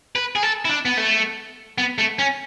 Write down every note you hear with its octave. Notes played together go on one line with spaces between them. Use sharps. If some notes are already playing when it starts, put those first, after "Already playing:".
B4
G#4
A4
E4
D4
B3
A3
B3
A3
C#4